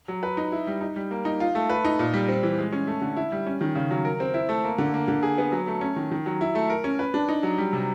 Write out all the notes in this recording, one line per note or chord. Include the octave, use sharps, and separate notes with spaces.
F#3
B4
D#4
E4
G3
D#4
G3
A#3
D#4
F4
A3
B4
D#4
A#2
G3
C4
E3
G#3
C#4
A3
D3
E4
G3
C#4
D#3
C#3
F#3
A#4
C4
E4
A3
A#3
D3
A#3
D3
G#4
B3
F#3
A3
C#4
D#3
D#3
F#3
E4
A3
A#4
C#4
B4
D4
D#4
F#3
G3
C3